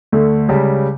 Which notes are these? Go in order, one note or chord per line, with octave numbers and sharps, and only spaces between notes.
D2 D3 A3
C#2 C#3 G3